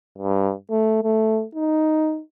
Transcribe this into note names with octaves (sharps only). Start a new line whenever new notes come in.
G2
A3
A3
D#4